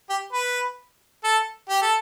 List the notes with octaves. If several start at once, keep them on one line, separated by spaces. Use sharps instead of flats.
G4
B4
A4
G4
A4